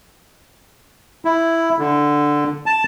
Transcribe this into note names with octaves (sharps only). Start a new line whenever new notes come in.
E4
D3
A5